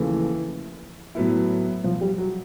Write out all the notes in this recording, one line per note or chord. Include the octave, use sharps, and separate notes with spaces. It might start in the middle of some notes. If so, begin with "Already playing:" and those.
Already playing: D#2 C#3 E3 F3 A3
A2 F#3 B3 E4
F3
G3
F#3